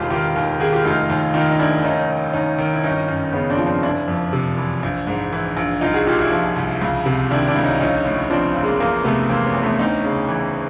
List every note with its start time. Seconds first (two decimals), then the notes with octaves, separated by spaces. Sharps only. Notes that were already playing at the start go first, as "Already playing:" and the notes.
Already playing: E1 D#2 F4 G4
0.10 D#3 F4 G4
0.36 D#2
0.60 D#3 F#4 G#4
0.72 F4 G4
0.85 F1 D#4 F4
1.10 D#2
1.34 D#3 D#4 F4
1.51 D#4
1.59 F1 D4 E4
1.84 D#2 C#4 D#4
2.09 D#3
2.33 D#2 C#4 D#4
2.58 D#3
2.73 E4
2.83 G1 C#4 D#4
3.08 F#2
3.33 C#3 B3 C#4
3.50 C4 D4
3.58 F3
3.66 C4 D4
3.82 F#1 D4 E4
4.08 F2
4.33 C3
4.57 E3
4.83 A#1
5.07 G#2
5.33 E3
5.57 A#1
5.81 C2 D#4 F4
5.94 F#4 G#4
6.07 A#2 F4 G4
6.19 E4 F#4
6.32 F3
6.56 C2
6.82 C#2
7.06 C3
7.31 D#3 D4 E4
7.47 D4 E4
7.56 C#2
7.63 C#4 D#4
7.80 A#1 C#4 D#4
8.05 A2
8.30 F3 C4 D4
8.55 A#1
8.63 G#3 A#3
8.80 E2 G#3 A#3
9.04 C3 A3 B3
9.29 E3 A#3 C4
9.46 B3 C#4
9.54 E2
9.63 A3 B3
9.79 D2 C#4 D#4
10.04 C#3
10.29 E3